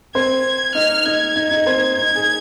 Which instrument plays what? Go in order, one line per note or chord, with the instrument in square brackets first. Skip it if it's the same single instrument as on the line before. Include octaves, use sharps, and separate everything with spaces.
[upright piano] C4 C5 [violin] G#6
[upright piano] D#4 D#5 [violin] F6
[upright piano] D#4 D#5 [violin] G#6
[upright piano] D#4 D#5
D#4 D#5
C4 C5
[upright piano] D#4 [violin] G#6
[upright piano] G#4